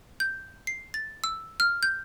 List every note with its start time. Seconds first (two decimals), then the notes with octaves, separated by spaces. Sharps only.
0.20 G6
0.67 C7
0.94 A6
1.24 E6
1.60 F6
1.83 G6